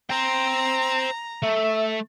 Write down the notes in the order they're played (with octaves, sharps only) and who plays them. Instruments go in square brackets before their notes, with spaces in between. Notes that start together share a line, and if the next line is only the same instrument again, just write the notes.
[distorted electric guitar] C5 G5 [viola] A#5
[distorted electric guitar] A3 [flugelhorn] E5